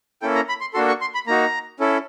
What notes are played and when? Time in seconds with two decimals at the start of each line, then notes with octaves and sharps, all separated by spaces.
0.22 A#3 C#4 E4 A4 G5
0.35 A#5
0.49 B5
0.61 C6
0.74 A#3 D4 F#4 A4 C6
0.88 C#6
1.01 C6
1.14 B5
1.27 A#3 D#4 F#4 A#5
1.80 C#4 E4 A4